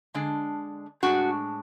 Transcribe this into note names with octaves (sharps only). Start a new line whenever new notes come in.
D3 G#3 D4
A2 G#3 D4 F#4